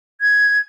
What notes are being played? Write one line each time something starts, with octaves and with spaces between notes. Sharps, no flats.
G#6